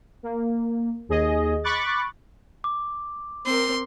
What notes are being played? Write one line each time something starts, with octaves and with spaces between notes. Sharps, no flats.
A#3
D#2 G#4 D#5
B5 C#6 D6 F#6 A6
D6
C4 A#4 C6